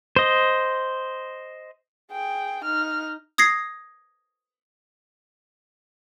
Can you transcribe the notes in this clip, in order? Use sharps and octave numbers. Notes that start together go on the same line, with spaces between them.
C5 D#5
G#4 G5
D#4 F6
D#6 G#6 A#6 C7